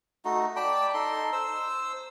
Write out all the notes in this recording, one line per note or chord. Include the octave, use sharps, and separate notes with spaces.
A3 D#4 F#4
D5 G5 A5 B5
D#4 A4 C6
C5 E6